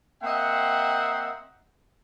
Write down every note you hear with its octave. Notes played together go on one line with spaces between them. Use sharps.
A#3 C4 D#5 E5 F#5 G5